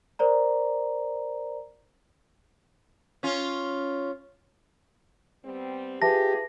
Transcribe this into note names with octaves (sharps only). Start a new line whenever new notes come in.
A#4 C5 D5 A#5
C#4 F4
G3 B3 C4
F4 G4 G#4 B4 E5 A5 A#6